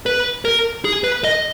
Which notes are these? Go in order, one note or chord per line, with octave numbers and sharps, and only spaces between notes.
B4
A#4
G#4
B4
D#5